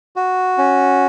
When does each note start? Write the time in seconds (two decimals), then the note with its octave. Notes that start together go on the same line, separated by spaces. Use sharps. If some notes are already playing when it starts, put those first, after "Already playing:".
0.16 F#4
0.58 C#4